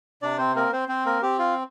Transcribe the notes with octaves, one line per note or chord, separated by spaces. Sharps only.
C3 D4 D5
C4 C5
A#3 C4 A#4
C4 C5
C4 C5
A#3 A#4
C4 G4
F4 F5